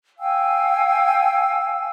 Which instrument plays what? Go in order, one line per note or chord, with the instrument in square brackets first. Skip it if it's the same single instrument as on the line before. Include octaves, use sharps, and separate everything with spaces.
[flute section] F5 G5 G#5 E6